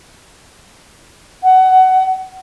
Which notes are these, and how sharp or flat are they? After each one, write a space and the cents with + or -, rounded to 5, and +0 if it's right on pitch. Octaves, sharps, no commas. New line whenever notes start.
F#5 +20